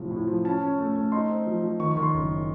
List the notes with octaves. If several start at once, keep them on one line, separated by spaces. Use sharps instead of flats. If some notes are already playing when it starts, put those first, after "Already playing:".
Already playing: A2 C3 F3
A2
F3
C#4 A5
C#4
A3
A3
D#4 C6
C4
F3
F3
D#3 C#6
C#6
D#3
C6
F#1